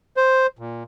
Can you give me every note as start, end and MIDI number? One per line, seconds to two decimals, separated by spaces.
0.17 0.47 72
0.59 0.83 46